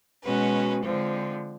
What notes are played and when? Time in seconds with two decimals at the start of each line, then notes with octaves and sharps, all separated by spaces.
0.24 B2 G#3 C#4 F#4 B4
0.84 D3 F3 G#3 C4